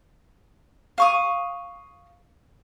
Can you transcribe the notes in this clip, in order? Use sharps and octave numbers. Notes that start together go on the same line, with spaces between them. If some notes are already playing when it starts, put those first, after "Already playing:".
F5 C#6 D#6